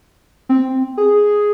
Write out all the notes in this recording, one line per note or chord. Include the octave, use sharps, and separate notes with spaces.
C4
G#4